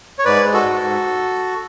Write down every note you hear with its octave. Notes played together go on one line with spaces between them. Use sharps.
C#5
G#2 B4 D5
G#3
F#4 A4
G#2
G#2